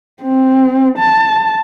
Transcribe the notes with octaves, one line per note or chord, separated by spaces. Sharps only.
C4
A5